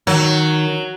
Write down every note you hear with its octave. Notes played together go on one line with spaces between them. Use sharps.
D#3 F#3